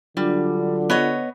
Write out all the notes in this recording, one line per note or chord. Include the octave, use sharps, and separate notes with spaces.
D3 F#3 G3 D4 F4
B3 C#5 D#5